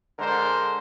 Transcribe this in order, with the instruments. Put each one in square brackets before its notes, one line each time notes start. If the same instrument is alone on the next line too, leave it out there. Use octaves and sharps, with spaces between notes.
[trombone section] D3 G#3 A#4 C5